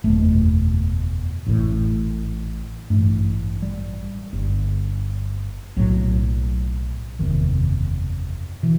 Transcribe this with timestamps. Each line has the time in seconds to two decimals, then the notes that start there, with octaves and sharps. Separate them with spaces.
0.04 F#1 E2 B2 A3
1.47 A1 A2
2.90 A1 G2 A3
3.62 G3
4.33 G1 G2
5.76 B1 A2 F#3
7.19 F#1 E2 C3 D#3
8.63 B2 E3